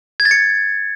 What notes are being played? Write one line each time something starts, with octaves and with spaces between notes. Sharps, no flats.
G#6
A6
C#7